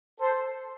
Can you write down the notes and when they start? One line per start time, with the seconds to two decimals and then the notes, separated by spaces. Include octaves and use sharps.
0.20 A4 C5